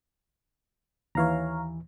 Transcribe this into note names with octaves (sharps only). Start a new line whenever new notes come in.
D#2 E3 C#5 F5 A#5